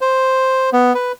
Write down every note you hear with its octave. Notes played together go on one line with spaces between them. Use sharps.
C5
B3
B4